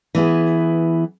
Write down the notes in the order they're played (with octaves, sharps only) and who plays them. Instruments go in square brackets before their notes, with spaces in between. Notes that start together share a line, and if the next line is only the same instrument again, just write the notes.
[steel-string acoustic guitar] E3 B3 E4 G#4